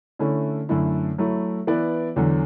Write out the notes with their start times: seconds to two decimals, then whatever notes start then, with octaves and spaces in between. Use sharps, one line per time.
0.19 D3 A3 C#4 E4 A4
0.69 F#2 D3 A3 E4
1.18 F#3 A3 E4
1.67 E3 B3 E4 B4 D5
2.16 E2 D3 F#3